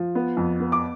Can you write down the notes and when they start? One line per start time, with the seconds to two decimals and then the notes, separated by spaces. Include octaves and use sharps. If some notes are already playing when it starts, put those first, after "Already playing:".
Already playing: F3
0.15 B3
0.37 F2
0.60 B3
0.72 D6